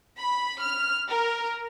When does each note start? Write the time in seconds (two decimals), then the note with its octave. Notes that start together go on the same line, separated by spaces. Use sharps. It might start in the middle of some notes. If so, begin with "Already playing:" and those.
0.19 B5
0.61 F6
1.08 A#4